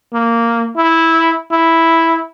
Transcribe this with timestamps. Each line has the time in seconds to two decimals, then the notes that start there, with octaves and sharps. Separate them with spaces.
0.13 A#3
0.77 E4
1.52 E4